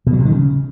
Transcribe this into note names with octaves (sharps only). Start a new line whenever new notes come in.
B2
F#3
C3
D#3
C#3